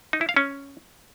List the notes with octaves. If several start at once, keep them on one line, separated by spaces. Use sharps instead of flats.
D#4
E4
F5
C#4